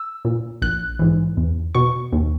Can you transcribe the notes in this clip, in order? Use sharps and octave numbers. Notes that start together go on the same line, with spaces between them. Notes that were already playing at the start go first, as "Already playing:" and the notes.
Already playing: E6
A#2
A#1 F#6
G#2 E3
E2
B2 C#6
D#2